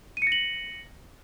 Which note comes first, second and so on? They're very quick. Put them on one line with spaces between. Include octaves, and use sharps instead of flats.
D#7 C#7 A#6 F#7